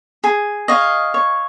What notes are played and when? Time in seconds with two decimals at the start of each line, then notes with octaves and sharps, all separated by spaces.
0.24 G#4
0.68 C#5 D#5 F5
1.14 C#5